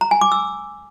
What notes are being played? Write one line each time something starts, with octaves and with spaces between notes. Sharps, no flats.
A#5
G#5
D6
E6